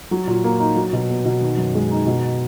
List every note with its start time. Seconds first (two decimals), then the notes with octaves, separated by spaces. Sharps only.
0.11 F#3
0.27 A#2
0.44 A#3
0.59 D#4
0.76 F#3
0.93 B2
1.09 B3
1.25 B2
1.41 D#3
1.57 F#2
1.74 G#3
1.91 D#4
2.06 B2